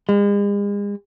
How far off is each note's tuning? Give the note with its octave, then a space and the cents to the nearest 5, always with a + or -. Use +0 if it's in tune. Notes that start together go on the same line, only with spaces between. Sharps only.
G#3 -40